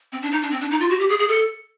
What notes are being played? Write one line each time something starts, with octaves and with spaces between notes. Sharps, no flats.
C4
D4
D#4
D4
C4
D4
D#4
F4
F#4
G4
G#4
G#4
A4